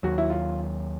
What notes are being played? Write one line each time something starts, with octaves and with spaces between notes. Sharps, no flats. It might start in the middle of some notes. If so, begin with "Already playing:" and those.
D#2 D#3 F#3 F#4
E4
F4